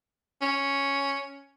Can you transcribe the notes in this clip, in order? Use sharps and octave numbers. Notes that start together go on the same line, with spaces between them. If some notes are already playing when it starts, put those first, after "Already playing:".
C#4